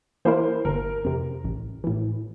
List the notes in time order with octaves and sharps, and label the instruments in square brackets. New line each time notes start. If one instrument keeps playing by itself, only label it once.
[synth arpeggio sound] E3 A#3 E4 A#4 [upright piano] C5
[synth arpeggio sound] G1 [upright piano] A#4
[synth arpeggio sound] F2 C3
A1
A2 E3